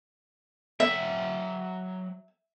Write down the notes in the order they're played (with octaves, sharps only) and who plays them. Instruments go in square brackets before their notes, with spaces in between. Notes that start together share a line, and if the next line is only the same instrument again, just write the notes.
[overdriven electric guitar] F#3 G5 [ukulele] E5